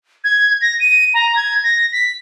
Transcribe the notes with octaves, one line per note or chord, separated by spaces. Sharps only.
G#6
A#6
D#7
A#5
G#6
A#6
B6